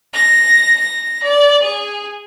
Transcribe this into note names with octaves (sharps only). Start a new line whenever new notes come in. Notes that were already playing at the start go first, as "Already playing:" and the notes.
A#6
A#6
D5
G#4